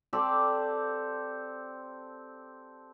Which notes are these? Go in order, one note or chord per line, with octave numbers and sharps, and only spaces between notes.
C4 G4 A4 D5